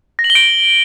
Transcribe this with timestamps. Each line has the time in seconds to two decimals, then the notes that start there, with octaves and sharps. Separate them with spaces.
0.19 A#6
0.24 F#7
0.30 G7
0.35 D7